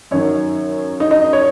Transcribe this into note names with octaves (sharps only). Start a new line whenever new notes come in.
F#2 D#3 F#3 C#5
D#4 D#5
D#4 D#5
C#5